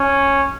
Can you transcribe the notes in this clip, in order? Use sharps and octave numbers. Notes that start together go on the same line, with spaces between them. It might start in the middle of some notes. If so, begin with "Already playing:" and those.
Already playing: C#4